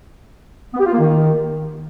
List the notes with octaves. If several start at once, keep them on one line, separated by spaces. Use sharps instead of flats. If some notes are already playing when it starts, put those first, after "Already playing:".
B3
G4
F4
A#3
D#3